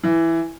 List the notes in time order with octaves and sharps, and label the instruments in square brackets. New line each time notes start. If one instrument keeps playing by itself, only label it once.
[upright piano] E3